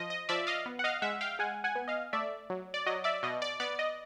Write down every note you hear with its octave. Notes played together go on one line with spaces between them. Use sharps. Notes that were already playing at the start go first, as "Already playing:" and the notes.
Already playing: F3 D#5
D#5
F3 D5 E5
D#5 F5
B3
F#5
D#5 F5
G#3 E5 F#5
F5 G5
G#3 F#5 G#5
F#5 G#5
B3
D#5 F5
A3 D5 E5
F#3
D5
F#3 D#5
D5 E5
B2 D#5
D5
B3 D5
D#5